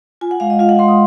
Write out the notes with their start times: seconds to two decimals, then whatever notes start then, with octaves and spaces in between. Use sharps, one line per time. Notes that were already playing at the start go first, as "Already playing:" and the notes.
0.21 F4 G#5
0.31 F#5
0.40 G#3 F5
0.50 D#5
0.59 F4 F5
0.69 F#5
0.79 G#3 C6
0.88 D#6